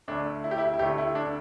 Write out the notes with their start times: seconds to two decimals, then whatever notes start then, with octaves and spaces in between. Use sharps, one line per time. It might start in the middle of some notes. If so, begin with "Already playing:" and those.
0.08 D2 D3 A3 D4
0.44 E4
0.51 G4
0.58 E4
0.74 E4
0.79 D2 D3 A3 G4
0.98 E4
1.15 D4